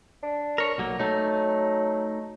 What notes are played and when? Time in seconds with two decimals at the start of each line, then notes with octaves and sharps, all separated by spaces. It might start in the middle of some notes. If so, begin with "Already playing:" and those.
0.23 D4
0.58 A#4 C#5
0.78 B1 F#3 A#3
0.99 F#3 A3 D#4